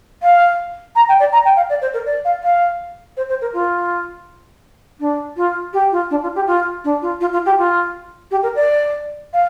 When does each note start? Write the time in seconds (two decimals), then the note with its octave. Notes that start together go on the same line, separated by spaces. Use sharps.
0.23 F5
0.96 A#5
1.09 G5
1.20 D5
1.32 A#5
1.45 G5
1.57 F5
1.70 D5
1.82 C5
1.94 A#4
2.06 D5
2.25 F5
2.43 F5
3.17 C5
3.29 C5
3.41 A#4
3.54 F4
5.00 D4
5.37 F4
5.73 G4
5.92 F4
6.11 D4
6.23 F4
6.36 G4
6.47 F4
6.84 D4
7.02 F4
7.21 F4
7.33 F4
7.46 G4
7.58 F4
8.31 G4
8.43 A#4
8.56 D5
9.34 F5